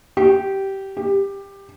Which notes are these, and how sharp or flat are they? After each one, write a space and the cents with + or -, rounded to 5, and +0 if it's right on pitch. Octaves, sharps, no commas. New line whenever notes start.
G4 -15
G4 +15